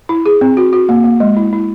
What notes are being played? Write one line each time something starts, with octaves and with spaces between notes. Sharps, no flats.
E4
G#4
C4
F#4
F#4
A#3
A#3
G#3
E4
E4